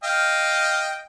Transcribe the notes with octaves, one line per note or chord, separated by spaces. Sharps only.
D#5 F5 G5